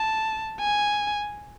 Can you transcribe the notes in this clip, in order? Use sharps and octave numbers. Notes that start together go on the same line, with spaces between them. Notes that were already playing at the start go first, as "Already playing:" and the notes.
Already playing: A5
G#5